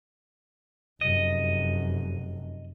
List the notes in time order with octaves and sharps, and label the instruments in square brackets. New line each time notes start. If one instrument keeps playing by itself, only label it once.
[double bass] F1 F#2 [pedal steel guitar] D#5